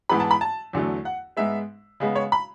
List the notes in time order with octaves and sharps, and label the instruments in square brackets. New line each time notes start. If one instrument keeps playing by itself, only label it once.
[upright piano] G#2 E3 B3 B5
A5
B5
A5
E2 D3 F#3 A3
F#5
G#2 G#3 B3 E5
C#3 G#3 B3
C#5
B5